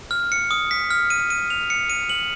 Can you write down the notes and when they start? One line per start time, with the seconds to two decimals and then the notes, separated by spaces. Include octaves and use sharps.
0.11 F6
0.32 C#7
0.51 D#6
0.71 B6
0.91 F6
1.10 D#7
1.30 D#7
1.50 F7
1.70 C#7
1.90 D#7
2.09 F#7